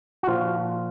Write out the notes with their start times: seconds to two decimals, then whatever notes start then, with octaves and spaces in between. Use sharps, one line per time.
0.23 F#4
0.28 A#2 F3 F4